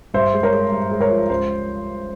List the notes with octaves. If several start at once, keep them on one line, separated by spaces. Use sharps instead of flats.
G2 C5 E5
G#3
A#4 C#5
G#3
G2
G#3
A#4 C#5
F3
C#2 C5